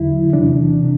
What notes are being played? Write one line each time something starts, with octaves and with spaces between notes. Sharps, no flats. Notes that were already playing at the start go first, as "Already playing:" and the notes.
Already playing: E2 D3 F#3 E4
E2 C3 E3 D4
C3